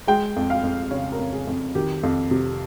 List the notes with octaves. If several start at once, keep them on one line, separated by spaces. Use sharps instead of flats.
G#3 G5
F2
F5
F2
C#3 C#5
A#4
F2
G#4
F2
D#3 G4
F2
C3